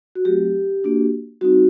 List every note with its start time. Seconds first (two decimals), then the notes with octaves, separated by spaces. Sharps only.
0.15 F#4
0.25 F#3 A3 C4 G4
0.84 A#3 D4 F#4
1.41 G3 C4 D#4 F#4